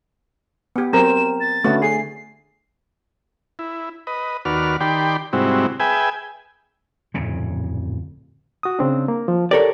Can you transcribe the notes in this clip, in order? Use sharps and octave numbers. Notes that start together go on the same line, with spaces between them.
B3 G4
F#3 C4 A#4 E7
A6
D3 A3 C#4 F#4 B4
G#4 C7
E4
B4 D#5
D#2 F#4 B4 D5 F6
D#3 G4 D5 G5 B5 C6
G#2 C3 G3 C4 E4 F#4
G#4 B4 E5 G5 G#5
D1 F2 A#2 C#3
F#4 D#6
C#3 C4 D4
A#3
F3
G4 A4 A#4 C#5 D5